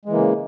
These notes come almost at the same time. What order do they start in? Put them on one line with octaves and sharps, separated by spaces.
G#3 E3 A#3 C#3